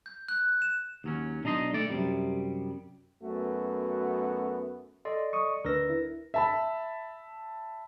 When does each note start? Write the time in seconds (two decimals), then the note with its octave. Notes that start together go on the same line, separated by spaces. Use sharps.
0.06 G6
0.28 F#6
0.62 E7
1.04 D#2 F#3 C#4
1.44 B1 D4 D#4 D#5 C6
1.74 A3 D5
1.90 F#2 C3 G3
3.22 F#2 A3 B3 F#4
5.05 A4 D5 D#5 C6
5.33 C#6 D#6
5.65 D2 D4 A#4 B4 E6 A#6
5.89 E4
6.34 E5 A5 B5